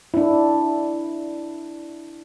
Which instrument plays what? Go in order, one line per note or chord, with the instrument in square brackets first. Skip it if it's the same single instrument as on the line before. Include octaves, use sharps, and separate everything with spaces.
[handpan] D4 E4